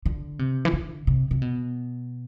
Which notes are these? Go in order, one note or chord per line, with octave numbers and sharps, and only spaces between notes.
D3
C3
E3
D3
C3
C3
B2